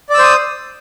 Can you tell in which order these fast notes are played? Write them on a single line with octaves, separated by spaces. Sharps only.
D5 E6 C5 D#6